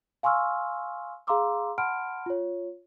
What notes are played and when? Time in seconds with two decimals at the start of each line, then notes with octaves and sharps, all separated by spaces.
0.23 F5 G#5 C6 C#6 E6 F6
1.27 G#4 F5 A#5 C6 D6 E6
1.78 F#5 A5 B5 C6 F6 D7
2.26 F4 C#5